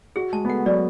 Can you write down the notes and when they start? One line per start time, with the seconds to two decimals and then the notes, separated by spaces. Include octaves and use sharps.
0.16 F#4 G#4
0.33 G#3 A5
0.45 B3
0.49 A3 F#5
0.66 F#3 D5